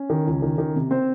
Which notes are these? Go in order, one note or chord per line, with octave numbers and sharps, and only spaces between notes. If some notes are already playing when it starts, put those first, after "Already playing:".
Already playing: C#4
D#3
C#2
D#3
D#3
C3
C4 C5